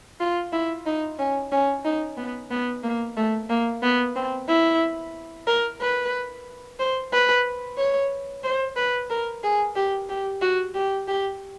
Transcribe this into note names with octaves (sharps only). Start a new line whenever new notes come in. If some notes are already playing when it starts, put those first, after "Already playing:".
F4
E4
D#4
C#4
C#4
D#4
B3
B3
A#3
A3
A#3
B3
C4
E4
A#4
B4
C5
B4
C#5
C5
B4
A#4
G#4
G4
G4
F#4
G4
G4